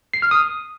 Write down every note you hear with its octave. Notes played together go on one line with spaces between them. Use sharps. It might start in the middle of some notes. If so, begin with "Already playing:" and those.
C7
F6
D#6